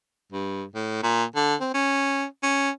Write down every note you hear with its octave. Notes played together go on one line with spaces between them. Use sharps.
G2
A2
A#2
D3
C4
C#4
C#4